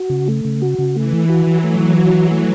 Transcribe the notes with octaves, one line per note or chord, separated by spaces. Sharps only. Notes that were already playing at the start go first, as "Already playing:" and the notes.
Already playing: F#4
C#3
A3
C#3
F#4
C#3
E3 A3
E3
F#4
E3 F#3
A3
E3
F#4
E3
A3